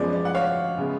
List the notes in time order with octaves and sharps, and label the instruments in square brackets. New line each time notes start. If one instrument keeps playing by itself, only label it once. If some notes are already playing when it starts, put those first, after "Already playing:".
Already playing: [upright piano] F#2 F3 G#3 B3 D5
D5
F#5
C#5 F5
C#3 G#3 B3